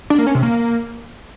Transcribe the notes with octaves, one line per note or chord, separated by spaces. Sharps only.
D4
A#3
C#4
C3
A#3